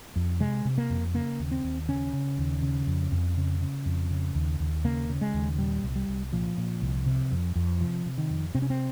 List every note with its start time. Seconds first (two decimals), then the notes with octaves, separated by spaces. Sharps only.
0.16 F2
0.40 C3 G#3
0.65 C3
0.78 A#3
0.90 F2
1.14 C#3 A#3
1.39 D#2
1.51 C4
1.64 D#2
1.89 C#3 C#4
2.13 C#3
2.38 D#2
2.62 C#3
2.87 F2
3.12 F2
3.37 C#3
3.61 C#3
3.86 F2
4.10 C#3
4.35 D#2
4.60 D#2
4.85 C#3 A#3
5.09 C#3
5.21 G#3
5.34 D#2
5.58 A#2 G3
5.83 C2
5.96 G3
6.08 C2
6.32 A#2 F3
6.57 A#2
6.82 C2
7.06 C3
7.32 F2
7.56 F2
7.80 C3 F3
8.06 C3
8.18 D#3
8.30 F2
8.55 C3 C4
8.62 C#4
8.70 C4